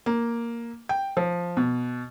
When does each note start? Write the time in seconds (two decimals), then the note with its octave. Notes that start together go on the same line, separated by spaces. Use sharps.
0.06 A#3
0.89 G5
1.17 F3
1.57 B2